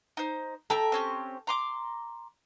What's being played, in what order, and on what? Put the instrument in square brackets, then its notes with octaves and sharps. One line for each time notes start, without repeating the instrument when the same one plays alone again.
[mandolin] D#4 C5
[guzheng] A4 [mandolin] E5 G5 A#5
[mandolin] C4 C#4 G4
A#5 C6 D6